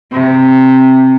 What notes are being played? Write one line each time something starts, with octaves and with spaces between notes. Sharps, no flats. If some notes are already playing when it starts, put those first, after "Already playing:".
C3